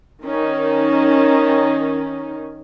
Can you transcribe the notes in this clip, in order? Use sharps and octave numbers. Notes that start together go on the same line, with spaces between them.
D#3 C#4 D#4